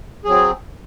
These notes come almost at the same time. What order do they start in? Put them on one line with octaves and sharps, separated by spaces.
G#4 F#3 C4